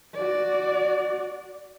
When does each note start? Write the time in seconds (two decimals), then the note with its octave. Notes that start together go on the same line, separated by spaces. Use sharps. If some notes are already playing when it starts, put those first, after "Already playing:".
0.14 F#4 D5